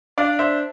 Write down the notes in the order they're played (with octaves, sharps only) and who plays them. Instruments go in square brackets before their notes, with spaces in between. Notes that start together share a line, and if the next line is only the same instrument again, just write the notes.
[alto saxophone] D4 [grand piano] D5 F5
[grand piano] C5 E5